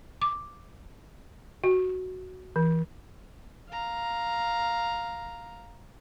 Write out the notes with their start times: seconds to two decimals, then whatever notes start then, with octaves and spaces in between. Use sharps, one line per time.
0.22 D6
1.64 F#4
2.56 E3
3.69 F5 A#5